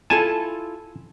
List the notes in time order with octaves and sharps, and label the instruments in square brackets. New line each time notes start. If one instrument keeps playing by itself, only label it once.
[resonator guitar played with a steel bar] E4 F4 A4 [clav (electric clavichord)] G#5 A5